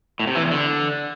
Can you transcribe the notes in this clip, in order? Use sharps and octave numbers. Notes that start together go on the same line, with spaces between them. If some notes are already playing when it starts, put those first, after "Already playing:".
A2
C3
E3
E2
D3